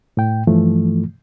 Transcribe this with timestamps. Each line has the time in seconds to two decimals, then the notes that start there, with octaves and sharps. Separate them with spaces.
0.17 A2 G5
0.47 G2 E3 F3 A3